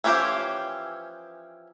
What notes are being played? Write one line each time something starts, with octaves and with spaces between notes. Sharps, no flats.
E3 F3 C#4 G4 C5